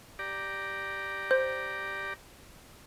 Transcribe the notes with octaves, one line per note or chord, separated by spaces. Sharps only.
G4 D5 A#5
C5